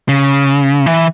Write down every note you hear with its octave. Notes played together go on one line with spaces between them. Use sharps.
C#3
E3